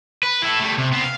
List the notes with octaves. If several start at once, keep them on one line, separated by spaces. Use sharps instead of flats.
B4
E4 A4
G3 A3
C3
B3 C4
F5